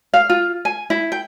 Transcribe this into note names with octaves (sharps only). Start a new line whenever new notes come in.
F5
F4
G#5
E4
G5